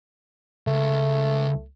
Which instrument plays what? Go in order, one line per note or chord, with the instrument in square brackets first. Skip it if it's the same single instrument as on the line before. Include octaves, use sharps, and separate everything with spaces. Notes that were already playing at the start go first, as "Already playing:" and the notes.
[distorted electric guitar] C#2 [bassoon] A3